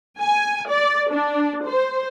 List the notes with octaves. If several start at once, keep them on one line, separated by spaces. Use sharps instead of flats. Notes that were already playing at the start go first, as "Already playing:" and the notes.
G#5
D5
D4
C5